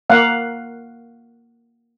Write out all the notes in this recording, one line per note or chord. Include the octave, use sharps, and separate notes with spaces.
A#3 F5 F#5